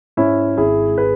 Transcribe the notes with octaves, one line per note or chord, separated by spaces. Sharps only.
G#2 C#4 E4
G#1 E4 G#4
G#4 B4